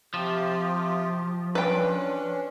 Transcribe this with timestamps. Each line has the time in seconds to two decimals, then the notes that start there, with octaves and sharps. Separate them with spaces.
0.14 C3 F3 F4 G4
1.55 C#4 D4 B4 G5